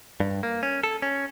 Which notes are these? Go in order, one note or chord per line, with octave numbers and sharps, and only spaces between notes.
G2
A#3
C#4
A4
C#4